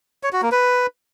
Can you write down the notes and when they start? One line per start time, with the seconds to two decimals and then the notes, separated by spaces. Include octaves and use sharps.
0.23 C#5
0.33 F#4
0.42 A#3
0.52 B4